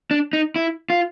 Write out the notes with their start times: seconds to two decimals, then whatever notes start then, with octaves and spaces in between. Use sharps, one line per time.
0.11 D4
0.33 D#4
0.56 E4
0.90 F4